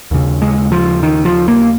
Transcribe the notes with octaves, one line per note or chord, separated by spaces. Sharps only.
D#2 C#3
G#3
F3
D#3
F3
A#3